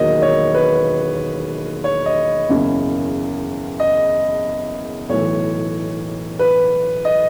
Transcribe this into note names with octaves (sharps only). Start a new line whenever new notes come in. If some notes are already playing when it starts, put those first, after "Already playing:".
Already playing: E1 D#2 D#3 F#3 D#5
C#5
B4
C#5
D#5
F#1 E2 C#3
D#5
B1 A2 E3 C#5
B4
D#5